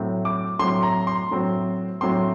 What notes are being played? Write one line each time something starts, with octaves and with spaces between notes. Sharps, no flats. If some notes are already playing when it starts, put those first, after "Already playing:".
Already playing: A2 F#3 C4
D6
A2 F#3 C4 C6
A#5
C6
A2 F#3 C4
A2 F#3 C4 C6